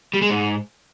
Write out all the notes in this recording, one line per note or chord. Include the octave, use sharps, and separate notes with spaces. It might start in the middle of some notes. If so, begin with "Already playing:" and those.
G3
G#3
G#2